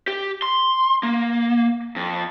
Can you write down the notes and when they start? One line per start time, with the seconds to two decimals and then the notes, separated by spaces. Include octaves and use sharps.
0.08 G4
0.42 C6
1.03 A#3
1.96 F2